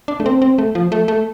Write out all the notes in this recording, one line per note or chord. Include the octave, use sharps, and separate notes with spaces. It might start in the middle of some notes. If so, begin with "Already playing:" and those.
D4
A3
C4
C4
A3
F3
A3
A3